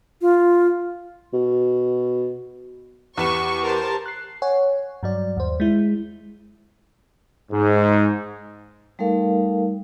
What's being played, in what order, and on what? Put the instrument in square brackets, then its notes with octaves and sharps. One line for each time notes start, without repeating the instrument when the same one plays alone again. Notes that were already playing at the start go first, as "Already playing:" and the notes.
[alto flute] F4
[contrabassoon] B2
[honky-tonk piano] E2 B4 E7 [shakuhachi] G4 [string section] C#6
[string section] A#4 C5 A5
[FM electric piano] F#6 C7
C#5 F#5 G#5
G2 F#3 D5
D#2 C5
G#3 E4
[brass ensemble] G#2
[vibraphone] G3 A3 D#4 A4 A#4 F5